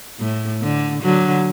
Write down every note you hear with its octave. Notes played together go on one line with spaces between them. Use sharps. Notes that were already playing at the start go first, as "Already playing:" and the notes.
A2
D3
D3 F#3